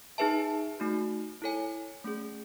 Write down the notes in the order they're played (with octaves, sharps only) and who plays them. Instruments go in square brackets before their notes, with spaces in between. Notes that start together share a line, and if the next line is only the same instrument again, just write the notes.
[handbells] D#4 G#4 B4 E5 A5
A3 D#4 F#4
E4 A4 C#5 G#5
A3 C#4 G#4